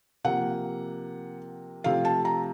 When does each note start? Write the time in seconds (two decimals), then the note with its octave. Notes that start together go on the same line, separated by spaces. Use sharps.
0.24 C3 F3 A#3 F#5
1.84 C3 F3 A3 F5
2.05 A5
2.25 A#5